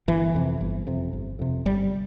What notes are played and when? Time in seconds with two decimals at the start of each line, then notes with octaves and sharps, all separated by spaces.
0.08 G1 E3
0.34 F2 C3
0.61 G1
0.87 F2 C3
1.13 G1
1.39 F2 C3
1.65 G1 G3